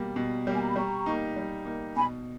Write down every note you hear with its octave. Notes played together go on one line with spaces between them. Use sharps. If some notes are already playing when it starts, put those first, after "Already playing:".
Already playing: B2 G3 A#3
B2
G3 A#3 G5
G#5
A#5
B5
G3 A#5 C#6
A#3 D#4
G3
A#3 D#4
B2 G#5 B5